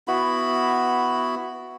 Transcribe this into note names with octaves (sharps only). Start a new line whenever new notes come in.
B3 E4 F#4 B5